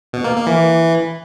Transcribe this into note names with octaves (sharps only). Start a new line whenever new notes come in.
B2
A#3
A#3
E3